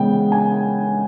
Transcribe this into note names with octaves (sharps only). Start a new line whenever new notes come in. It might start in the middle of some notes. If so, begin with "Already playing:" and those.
Already playing: C#3 E3 G#3 B3 G5
G#5